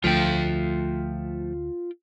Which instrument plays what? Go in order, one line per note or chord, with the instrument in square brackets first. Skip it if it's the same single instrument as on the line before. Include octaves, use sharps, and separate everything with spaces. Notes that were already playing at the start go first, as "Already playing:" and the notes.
[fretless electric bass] D2 [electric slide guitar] F3 A3 [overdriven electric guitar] F4 G5